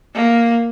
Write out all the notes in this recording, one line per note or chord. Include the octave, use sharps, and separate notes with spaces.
A#3